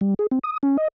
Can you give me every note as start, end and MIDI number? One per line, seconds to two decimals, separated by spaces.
0.01 0.14 55
0.19 0.27 68
0.32 0.39 60
0.44 0.58 87
0.63 0.77 61
0.78 0.88 75